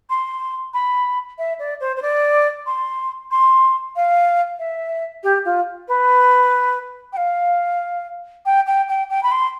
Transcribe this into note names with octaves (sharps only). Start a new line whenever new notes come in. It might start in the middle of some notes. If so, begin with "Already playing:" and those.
C6
B5
E5
D5
C5
C5
D5
C6
C6
F5
E5
G4
F4
B4
G5
F5
G5
G5
G5
G5
B5
C6